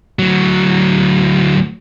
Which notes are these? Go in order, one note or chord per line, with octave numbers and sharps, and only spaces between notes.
D2 F#3